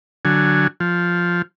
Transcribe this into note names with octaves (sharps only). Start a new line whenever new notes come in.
D3 F#3 G#5
F3